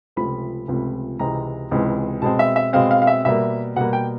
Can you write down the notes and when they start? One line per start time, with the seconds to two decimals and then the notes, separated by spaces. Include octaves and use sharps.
0.16 C#2 C3 F3 A3 C4 B5
0.68 C#2 C3 F3 A3 C4
1.19 C#2 C3 E3 G#3 C4 A#5
1.71 C#2 C3 E3 G#3 C4
2.22 B2 G#3 C4 A5
2.39 E5
2.56 E5
2.73 B2 G#3 C4 F5
2.91 F5
3.02 F5
3.07 E5
3.25 B2 G3 A#3 E5
3.76 B2 G3 A#3 F#5
3.93 G5